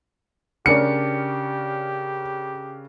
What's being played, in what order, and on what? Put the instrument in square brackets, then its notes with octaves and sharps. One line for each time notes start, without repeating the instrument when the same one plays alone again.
[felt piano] C#3 D4 A#4 [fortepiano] C#4 D5 [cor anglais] G4 [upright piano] C#7